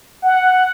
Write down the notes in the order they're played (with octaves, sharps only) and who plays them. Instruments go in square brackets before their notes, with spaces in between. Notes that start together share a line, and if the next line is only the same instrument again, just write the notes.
[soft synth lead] F#5